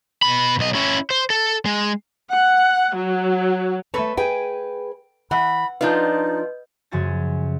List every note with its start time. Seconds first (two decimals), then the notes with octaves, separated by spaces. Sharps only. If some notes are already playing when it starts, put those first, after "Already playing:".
0.22 B2 B5
0.59 B1 D#5
0.75 C#4 E4
1.10 C5
1.30 A4
1.65 G#3
2.31 F#5
2.95 F#3
3.94 A3 A4 B4 C#5 A5
4.17 G#4 B4 G5 G#5
5.31 E3 F#5 B5
5.81 F3 D4 D#4 F4 B4 D#5 G6
6.91 F#2 C#3 F3 F#4 G#5 A6